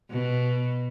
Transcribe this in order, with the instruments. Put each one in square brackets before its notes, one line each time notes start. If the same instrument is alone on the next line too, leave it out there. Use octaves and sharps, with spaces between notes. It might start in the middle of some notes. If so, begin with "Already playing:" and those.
[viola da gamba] B2